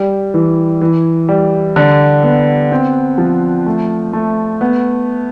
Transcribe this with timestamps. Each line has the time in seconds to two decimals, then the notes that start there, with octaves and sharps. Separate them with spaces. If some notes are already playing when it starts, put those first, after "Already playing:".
Already playing: G3
0.34 E3
0.81 E3
1.29 G3
1.76 D3
2.23 B3
2.72 C4
3.18 F3
3.66 A3
4.13 A3
4.61 B3